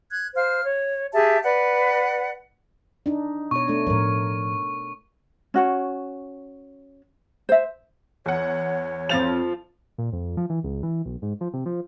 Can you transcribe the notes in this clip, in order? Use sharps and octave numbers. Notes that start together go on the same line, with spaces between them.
F#6 G#6
C5 F5 F6
C#5
G4 G#4 E5 A5
B4 D5 F#5
D4 D#4
B2 C#5 C#6
A3 D4
A2 F3 A#4 C#5
C#4 F#4 C#5
C5 E5
E2 C#5 F#5
F2 F3 A6 F7
A#2
F2
F3
E3
C#2
E3
B1
G#2
F3
C3
F3